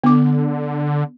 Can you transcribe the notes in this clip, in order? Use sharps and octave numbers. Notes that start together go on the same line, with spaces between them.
D3 B3 D6